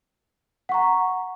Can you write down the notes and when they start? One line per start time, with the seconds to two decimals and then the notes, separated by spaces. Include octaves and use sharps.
0.69 F#5
0.72 C#6
0.74 A#5